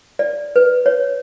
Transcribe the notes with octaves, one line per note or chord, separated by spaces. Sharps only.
D5
B4
C#5